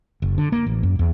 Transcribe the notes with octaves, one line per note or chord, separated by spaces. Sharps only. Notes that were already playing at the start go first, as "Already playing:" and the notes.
F#1
D3
A#3
A1
F#2
E2